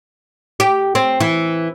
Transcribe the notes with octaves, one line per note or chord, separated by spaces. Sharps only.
G4
C4
E3